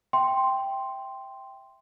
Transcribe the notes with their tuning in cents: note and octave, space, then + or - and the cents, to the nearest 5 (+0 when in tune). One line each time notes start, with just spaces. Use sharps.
E5 +0 G5 +0 C6 +0